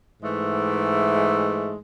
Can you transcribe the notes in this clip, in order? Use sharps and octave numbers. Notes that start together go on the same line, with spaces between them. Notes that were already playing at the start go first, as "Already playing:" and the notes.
G#2 E3 G#3 A3